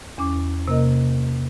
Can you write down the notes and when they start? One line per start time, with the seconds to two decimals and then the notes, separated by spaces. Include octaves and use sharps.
0.18 E2 C#4 D6
0.68 C3 A#3 A#4 D#5